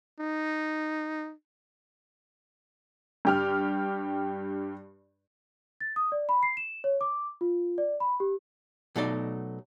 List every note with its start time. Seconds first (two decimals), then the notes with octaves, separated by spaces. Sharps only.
0.19 D#4
3.25 G2 G4 F6
5.81 A6
5.96 D#6
6.12 D5
6.29 B5
6.43 C7
6.57 E7
6.84 C#5
7.01 D6
7.41 F4
7.78 D5
8.00 B5
8.20 G4
8.96 B2 F#3 A3 D#4 D5